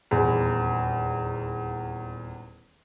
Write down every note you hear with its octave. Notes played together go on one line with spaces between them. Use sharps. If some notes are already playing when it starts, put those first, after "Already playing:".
D#1 E2